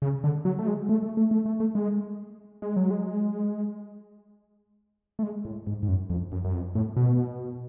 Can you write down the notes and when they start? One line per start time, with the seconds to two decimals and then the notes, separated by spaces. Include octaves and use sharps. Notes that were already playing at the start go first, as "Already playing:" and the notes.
0.02 C#3
0.24 D3
0.45 F#3
0.59 A3
0.67 G#3
0.89 A3
1.03 A3
1.17 A3
1.31 A3
1.46 A3
1.60 A3
1.75 G#3
2.62 G#3
2.76 F#3
2.91 G#3
5.19 A3
5.23 G#3
5.45 A2
5.67 G#2
5.83 G#2
5.88 F#2
6.10 F2
6.32 F#2
6.45 F#2
6.53 F2
6.75 A2
6.96 B2